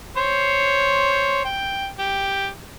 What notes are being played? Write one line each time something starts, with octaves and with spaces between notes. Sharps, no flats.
C5 C#5
G5
G4